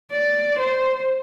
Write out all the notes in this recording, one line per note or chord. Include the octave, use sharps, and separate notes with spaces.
D5
C5